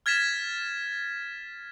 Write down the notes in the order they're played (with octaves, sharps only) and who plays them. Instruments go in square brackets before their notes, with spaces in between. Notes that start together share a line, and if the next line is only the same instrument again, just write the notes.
[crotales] F6 G#6 A6 B6 E7